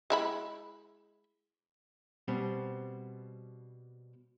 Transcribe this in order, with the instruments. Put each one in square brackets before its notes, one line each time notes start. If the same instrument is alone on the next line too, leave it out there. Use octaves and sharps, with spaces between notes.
[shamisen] G#3 E4 B5
[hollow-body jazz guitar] B2 G3 C4